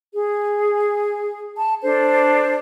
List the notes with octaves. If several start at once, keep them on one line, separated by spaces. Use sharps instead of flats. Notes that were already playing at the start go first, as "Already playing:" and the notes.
G#4
A5
D4 A4 C5